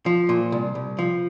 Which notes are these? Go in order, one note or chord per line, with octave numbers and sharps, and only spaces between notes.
F3
A#2
C2
C2
F3